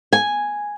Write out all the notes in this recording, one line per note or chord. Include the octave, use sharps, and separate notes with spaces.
G#5